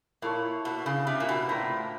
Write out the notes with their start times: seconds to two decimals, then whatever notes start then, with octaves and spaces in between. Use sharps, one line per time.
0.22 A#2 E4 A4 C#5
0.65 B2
0.86 C#3
1.07 C3
1.20 A#2
1.29 B2
1.49 A2 C4 F4 A#4 D5